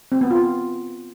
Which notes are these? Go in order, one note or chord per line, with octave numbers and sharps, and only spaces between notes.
C4
B3
F4